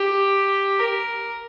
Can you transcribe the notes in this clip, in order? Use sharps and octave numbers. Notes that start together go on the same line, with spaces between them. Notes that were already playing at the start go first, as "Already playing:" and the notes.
Already playing: G4
A#4